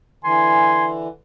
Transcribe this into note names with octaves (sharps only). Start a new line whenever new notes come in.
D3 E3 G#5 C6